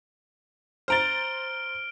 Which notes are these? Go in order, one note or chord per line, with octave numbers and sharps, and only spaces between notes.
C5 A#5 F6 A6 D7 G7